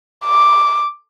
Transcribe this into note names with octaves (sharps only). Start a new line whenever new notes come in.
D6